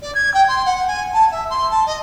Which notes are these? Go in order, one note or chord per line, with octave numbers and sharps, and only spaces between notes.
D5
G#6
G5
C6
F#5
G#5
A5
E5
C6
A5
D#5